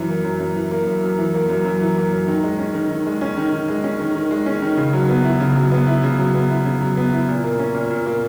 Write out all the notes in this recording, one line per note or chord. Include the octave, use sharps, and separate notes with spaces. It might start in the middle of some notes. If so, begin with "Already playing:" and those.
Already playing: F#2 E3
A#3
F#2
F#2
E3
A#3
F#2
F#2
E3
A#3
F#2
F#2
E3
A#3
F#2
D#3
G#3
C#4
D#3
D#3
G#3
C#4
D#3
D#3
G#3
C#4
D#3
D#3
G#3
C#4
D#3
C#3
F#3
B3
E4
C#3
F#3
B3
E4
C#3
F#3
B3
E4
C#3
F#3
B3
E4
A#2
A#3
C#4
A#2
A#2
A#3